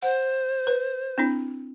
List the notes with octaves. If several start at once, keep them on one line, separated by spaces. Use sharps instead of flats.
C5 F#5
B4
C4 D4 E4